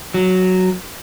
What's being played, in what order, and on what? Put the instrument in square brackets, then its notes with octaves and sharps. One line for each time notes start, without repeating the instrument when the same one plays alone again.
[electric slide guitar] F#3